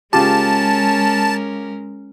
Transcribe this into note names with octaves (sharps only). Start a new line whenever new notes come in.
C#3 G#3 C#4 F4 G4 A#4 A5